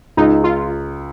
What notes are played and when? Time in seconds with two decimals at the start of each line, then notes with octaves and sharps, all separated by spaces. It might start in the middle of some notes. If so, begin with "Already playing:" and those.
0.17 C#2 D#4
0.44 F4